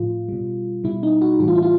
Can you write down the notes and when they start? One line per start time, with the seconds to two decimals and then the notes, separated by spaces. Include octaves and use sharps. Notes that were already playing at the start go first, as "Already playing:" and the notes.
Already playing: A2 F3 F4
0.29 B2 G3
0.84 B2 G3 E4
1.03 D#4
1.22 F#4
1.40 A2 E3 G3 F#4
1.48 F4
1.55 E4
1.63 F4